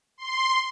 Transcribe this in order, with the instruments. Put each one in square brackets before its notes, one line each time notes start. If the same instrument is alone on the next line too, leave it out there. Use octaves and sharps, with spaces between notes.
[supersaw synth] C6